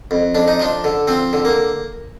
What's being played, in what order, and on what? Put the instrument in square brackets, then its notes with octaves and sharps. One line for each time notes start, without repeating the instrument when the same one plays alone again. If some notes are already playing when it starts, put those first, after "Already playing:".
[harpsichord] F2
F2 D4
D#4
F3 D4
D3
F3 C4
D3
A#3